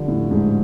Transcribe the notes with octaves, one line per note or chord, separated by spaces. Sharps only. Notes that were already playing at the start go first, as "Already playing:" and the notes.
Already playing: D3 F3 G3
A2
G#2